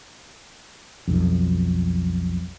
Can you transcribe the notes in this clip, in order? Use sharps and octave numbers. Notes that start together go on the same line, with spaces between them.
B1 F2